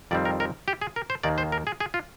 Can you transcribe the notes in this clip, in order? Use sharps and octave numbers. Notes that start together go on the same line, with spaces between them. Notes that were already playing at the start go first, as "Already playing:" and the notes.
F2 D#3 G3 C4 D5
A#4
A#4
G4
G#4
A#4
C5
D#2 D#3 A#3 D5
C5
A#4
G#4
G#4
F4